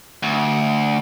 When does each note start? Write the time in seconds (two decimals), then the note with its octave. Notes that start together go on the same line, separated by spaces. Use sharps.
0.23 D2